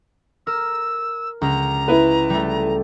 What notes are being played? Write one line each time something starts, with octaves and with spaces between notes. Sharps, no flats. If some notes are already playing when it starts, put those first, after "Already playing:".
A#4 E6
C#2 A#5
E4 B4
G3 A3